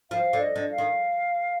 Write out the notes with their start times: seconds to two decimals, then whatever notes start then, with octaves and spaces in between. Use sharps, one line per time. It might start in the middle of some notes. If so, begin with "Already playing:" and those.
0.11 F3 F5
0.33 D3
0.41 D#5
0.56 D3
0.71 F5
0.78 D#3